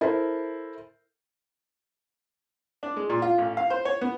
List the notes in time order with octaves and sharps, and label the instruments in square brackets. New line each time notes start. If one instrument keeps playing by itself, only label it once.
[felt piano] E4 A4 A#4 C5
[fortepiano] D4
G#3
A#2
F4
A1
F5
C5
C#5
B3